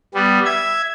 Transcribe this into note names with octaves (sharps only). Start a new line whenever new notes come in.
G3 B3
E5 G#6